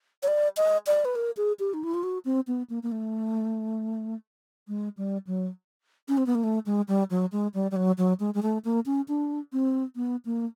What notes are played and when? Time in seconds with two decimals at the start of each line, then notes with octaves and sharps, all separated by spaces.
0.23 C#5
0.28 D5
0.57 D#5
0.87 D5
1.05 B4
1.15 A#4
1.37 G#4
1.59 G4
1.74 D#4
1.84 E4
1.94 F4
2.03 F#4
2.25 C4
2.47 B3
2.70 A#3
2.83 A#3
2.92 A3
4.68 G#3
4.97 G3
5.27 F#3
6.08 C#4
6.17 C4
6.26 B3
6.35 A#3
6.44 A3
6.66 G#3
6.88 G3
7.10 F#3
7.32 G#3
7.54 G3
7.71 G3
7.76 F#3
7.98 F#3
8.20 G#3
8.34 G#3
8.43 A3
8.65 A#3
8.86 C#4
9.08 D4
9.53 C4
9.96 B3
10.25 A#3